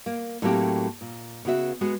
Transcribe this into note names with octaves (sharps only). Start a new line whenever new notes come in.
A#3
A2 F#3 A3 A#3 C4 G4
A#2
C#3 B3 F#4 E5
G#3 B3 F#4 G#4